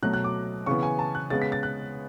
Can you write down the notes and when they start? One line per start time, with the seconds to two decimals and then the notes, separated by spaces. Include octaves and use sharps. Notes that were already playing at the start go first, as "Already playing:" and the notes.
0.03 B2 F#3 A3 F#6
0.13 F#6
0.24 D6
0.66 C#3 E3 B3 C#6
0.83 G#5
0.99 A5
1.15 F#6
1.30 C#3 G#3 B3 A6
1.42 B6
1.52 A6
1.63 F#6